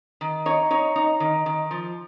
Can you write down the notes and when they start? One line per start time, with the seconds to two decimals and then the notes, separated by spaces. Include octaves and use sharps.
0.21 D#3
0.46 D#4 C#5
0.70 D#4 C#5
0.96 D#4
1.20 D#3
1.46 D#3
1.71 F3